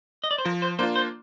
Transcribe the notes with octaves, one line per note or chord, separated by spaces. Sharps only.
D#5
D5
C5
F3 A#4
C5
A#3 D4 F4 C5
C5